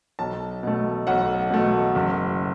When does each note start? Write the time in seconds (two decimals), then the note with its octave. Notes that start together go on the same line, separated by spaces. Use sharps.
0.19 B1 A5
0.63 B2 A3
1.07 B1 F#5
1.50 B2 A3
1.95 F#1